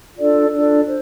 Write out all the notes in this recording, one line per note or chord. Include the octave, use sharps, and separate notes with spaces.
D4 F4 A4 D5
D4 F4 A4 D5
C5